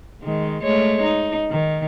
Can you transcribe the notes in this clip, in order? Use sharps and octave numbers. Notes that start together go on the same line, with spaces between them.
D#3 G#3
G#3 A3 C#5
D#4
D#3